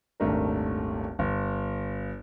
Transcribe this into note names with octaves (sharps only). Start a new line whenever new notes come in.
D#1 G#1 A3 D4 A#4
G1